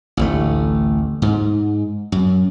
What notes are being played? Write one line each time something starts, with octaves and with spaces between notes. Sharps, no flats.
A1 D2 A3
G#2
F#2